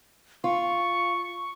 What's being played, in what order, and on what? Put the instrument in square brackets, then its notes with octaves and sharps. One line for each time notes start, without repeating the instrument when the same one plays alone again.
[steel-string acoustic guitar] F4 [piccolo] C#6